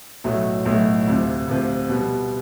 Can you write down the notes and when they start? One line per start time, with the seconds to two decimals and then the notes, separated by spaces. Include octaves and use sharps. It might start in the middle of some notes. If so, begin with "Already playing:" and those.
0.24 B1 A2 F#3 A3
0.65 B1 A2 F#3 A3
1.07 D2 C3 F3
1.48 D2 C3 F3
1.89 B2 G3 B3